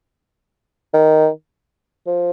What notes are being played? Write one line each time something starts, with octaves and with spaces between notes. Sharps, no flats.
D#3
F3